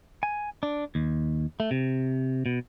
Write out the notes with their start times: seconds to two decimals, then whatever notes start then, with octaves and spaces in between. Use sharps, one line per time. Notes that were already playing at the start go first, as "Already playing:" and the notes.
0.23 G#5
0.63 D4
0.95 D#2
1.60 A3
1.71 C3
2.46 B2